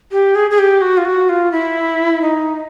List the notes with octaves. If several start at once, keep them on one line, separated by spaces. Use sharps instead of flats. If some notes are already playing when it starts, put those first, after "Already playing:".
G4
G#4
G#4
G4
F#4
F4
F#4
F4
E4
D#4